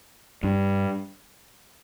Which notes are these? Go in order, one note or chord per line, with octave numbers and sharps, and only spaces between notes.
G2